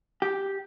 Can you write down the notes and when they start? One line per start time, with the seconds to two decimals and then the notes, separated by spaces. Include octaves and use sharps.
0.22 G4